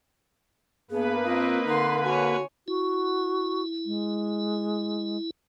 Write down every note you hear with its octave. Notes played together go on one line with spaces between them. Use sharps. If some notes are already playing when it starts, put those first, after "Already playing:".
G2 A#3 B3 G#4 B4
C4 F4 D#5
D3 D#4 A#4 C6
F#4 C#5 G#5
E4 F#4
G#3